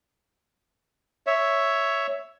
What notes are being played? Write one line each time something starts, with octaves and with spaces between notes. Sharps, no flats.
C#5 E5